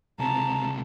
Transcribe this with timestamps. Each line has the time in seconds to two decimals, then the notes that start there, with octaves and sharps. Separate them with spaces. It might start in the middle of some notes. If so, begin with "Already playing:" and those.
0.19 C#2 C3 A5 A#5